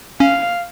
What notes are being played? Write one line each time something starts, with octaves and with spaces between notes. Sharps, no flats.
C#4 F5